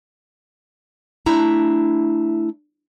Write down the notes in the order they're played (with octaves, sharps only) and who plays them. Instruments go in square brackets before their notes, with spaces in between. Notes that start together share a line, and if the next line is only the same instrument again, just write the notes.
[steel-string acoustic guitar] A3 D4 E4 A#5